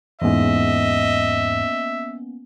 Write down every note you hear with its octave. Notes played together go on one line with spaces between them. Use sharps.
E2 G#2 A#3 B3 C#4 D#5 E5